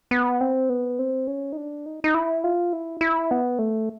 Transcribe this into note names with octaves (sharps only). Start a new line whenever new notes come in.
B3
C4
B3
C4
C#4
D#4
D4
D#4
D#4
E4
F4
E4
E4
B3
A3